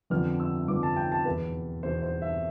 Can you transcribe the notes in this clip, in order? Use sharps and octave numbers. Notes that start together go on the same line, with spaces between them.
F2 D3 F3 B3 F6
E6
F2 D3 F3 B3 D6
A5
G5
A5
E2 B2 B3 B4
E2 B2 B3 C5
C5
E5